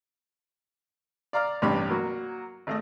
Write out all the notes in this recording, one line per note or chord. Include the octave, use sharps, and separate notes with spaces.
D5 F5 A#5 D6 F6
A1 G2 C3 G4 C#5 B5
F#3 A#3 F#4
G#1 A3 D#5